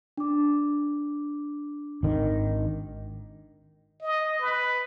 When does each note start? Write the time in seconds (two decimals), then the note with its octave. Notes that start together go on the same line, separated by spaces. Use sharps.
0.18 D4 D6
2.03 G#1 D#3
4.02 D#5
4.41 B4